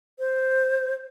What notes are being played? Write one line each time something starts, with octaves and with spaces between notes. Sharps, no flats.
C5